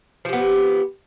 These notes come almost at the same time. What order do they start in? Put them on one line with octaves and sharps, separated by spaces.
F3 G4 B3